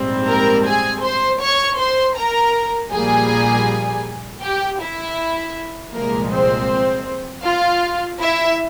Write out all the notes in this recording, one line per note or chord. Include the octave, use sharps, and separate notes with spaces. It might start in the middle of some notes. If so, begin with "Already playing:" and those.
Already playing: A#1 G#2 G3 C4
A#4 A#5
G#4 G#5
C5 C6
C#5 C#6
C5 C6
A#4 A#5
A#1 A#2 G3 A#3 G#4 G#5
G4 G5
E4 E5
C2 A#2 F3 G#3 A#3 A#4
C4 C5
F4 F5
E4 E5